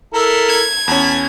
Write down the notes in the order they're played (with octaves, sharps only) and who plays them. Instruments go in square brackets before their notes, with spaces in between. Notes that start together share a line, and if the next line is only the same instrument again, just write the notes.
[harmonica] E4 A4 A#4
[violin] G#6
[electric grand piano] E2 C#4 [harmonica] A5 B5